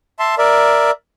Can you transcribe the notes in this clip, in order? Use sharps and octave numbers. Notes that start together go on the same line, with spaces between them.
E5 A5 C6
A#4 D5 E5